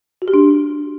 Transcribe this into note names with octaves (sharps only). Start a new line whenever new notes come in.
F#4
G4
D4